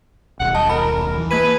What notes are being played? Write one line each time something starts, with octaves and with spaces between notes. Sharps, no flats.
D#1 B1 F#5
D#5 A5
A#4 B5
E3
A#3 B4 G#6 D#7